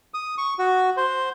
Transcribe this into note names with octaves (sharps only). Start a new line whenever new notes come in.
D#6
C#6
F#4
C5